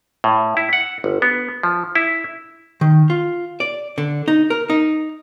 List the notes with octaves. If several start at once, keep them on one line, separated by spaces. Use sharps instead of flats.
A2
E4
F#5
G1
B3
F3
E4
D#3
F4
D5
D3
D#4
A#4
D#4